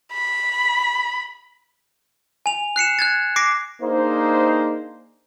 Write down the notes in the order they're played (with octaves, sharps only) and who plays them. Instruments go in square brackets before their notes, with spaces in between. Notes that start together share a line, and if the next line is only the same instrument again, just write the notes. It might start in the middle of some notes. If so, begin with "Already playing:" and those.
[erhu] B5
[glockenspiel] G#5 F7
F#6 C7 C#7 E7
F#6 G#6 A6
D6 A#6 C7 D7
[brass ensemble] A#3 D4 D#4 G#4 C5